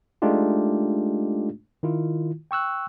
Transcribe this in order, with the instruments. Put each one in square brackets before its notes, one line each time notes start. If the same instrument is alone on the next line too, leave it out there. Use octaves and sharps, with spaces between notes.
[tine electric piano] G#3 A3 D4 D#4 F4 G4
D#3 E4 F4
G5 C#6 E6 F#6